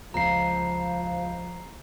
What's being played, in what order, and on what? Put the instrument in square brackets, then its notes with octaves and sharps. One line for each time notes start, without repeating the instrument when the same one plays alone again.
[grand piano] C#2 [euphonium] F3 [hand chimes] A#5 C7